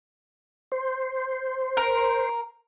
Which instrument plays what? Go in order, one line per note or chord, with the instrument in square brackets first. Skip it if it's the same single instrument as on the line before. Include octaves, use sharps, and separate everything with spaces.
[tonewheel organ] C5
[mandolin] A#4